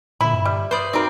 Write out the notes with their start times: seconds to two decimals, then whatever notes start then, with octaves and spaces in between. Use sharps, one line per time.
0.21 A#2 D3 E4 B5
0.33 G2
0.45 G3
0.71 B4 C5 D5 B5 D#6
0.93 C4 D#4 F#4 A#4 D5